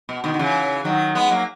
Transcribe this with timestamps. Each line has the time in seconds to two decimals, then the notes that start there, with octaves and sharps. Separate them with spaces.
0.09 B2
0.24 B2 D#3
0.34 D#3
0.39 C#3 E3
0.85 D#3 F#3
1.15 G#3 B3
1.31 F#3 A#3